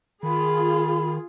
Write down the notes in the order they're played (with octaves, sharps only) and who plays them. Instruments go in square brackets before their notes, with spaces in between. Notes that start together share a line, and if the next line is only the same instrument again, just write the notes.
[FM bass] D#3 [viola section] F4 G#4 [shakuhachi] B5